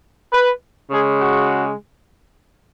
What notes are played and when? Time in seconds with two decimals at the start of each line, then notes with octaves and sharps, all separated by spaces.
0.33 B4
0.91 C#3 G#3 G#4
1.20 F#4